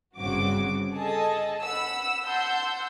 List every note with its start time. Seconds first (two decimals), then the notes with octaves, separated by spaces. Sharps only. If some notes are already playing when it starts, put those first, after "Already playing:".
0.19 G1 G2 C#3 C4 F#4 D6
0.96 G#4 A4 D#5 A5
1.62 F#5 B5 E6
2.23 F#5 A5 C6 E6 G6